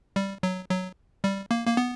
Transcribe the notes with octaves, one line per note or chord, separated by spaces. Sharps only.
G3
F#3
F#3
G3
A#3
A#3
B3